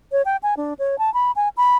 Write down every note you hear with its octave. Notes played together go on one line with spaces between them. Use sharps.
C#5
G5
G#5
D4
C#5
A5
B5
G#5
B5